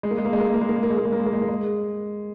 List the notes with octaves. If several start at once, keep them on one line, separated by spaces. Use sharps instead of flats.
G#3
A#3
G#3
A#3
G#3
A#3
G#3
A#3
G#3
A#3
G#3
A#3
G#3
A#3
G#3
A#3
G#3
A#3
G#3
A#3
G#3